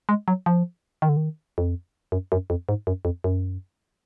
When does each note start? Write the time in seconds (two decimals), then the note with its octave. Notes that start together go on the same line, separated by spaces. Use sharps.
0.09 G#3
0.28 F#3
0.46 F3
1.02 D#3
1.09 D3
1.17 D#3
1.58 F2
2.12 F#2
2.32 F#2
2.50 F2
2.69 G#2
2.87 F#2
3.05 F2
3.24 F#2